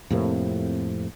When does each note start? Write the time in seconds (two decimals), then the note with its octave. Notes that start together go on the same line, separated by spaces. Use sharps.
0.11 F2 A2 C3 A#3